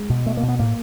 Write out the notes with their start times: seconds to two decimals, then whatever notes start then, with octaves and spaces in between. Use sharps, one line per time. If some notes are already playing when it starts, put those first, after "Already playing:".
Already playing: G#3
0.09 B2
0.26 B2 A3
0.37 A#3
0.43 B2
0.48 B3
0.59 A2 A#3